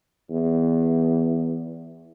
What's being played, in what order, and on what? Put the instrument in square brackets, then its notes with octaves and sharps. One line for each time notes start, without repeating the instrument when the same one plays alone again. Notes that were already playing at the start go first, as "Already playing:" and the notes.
[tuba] E2